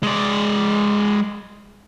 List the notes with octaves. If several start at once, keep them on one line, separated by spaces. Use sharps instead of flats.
G#3 D5